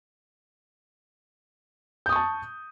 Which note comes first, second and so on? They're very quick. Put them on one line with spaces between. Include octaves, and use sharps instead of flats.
G6 D#6 C#6 A5